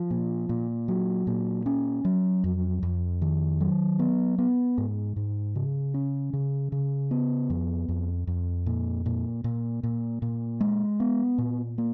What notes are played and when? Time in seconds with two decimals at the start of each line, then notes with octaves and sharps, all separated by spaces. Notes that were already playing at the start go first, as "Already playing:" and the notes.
Already playing: F3
0.10 A#2
0.49 A#2
0.88 F#3
1.27 A#2
1.66 C#4
2.05 F#3
2.44 F2
2.83 F2
3.22 D#3
3.60 F#3
3.99 B3
4.38 B3
4.78 G#2
5.16 G#2
5.55 C#3
5.94 C#4
6.33 C#3
6.72 C#3
7.11 B3
7.50 F2
7.89 F2
8.27 F2
8.66 A#2
9.06 A#2
9.44 A#2
9.83 A#2
10.22 A#2
10.61 G#3
11.00 B3
11.38 A#2
11.78 A#3